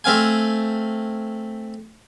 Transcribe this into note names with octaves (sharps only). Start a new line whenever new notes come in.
A3 C4 F5 G#5